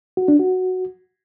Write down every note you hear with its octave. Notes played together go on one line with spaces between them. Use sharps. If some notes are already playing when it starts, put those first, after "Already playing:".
F#4
D4
F#4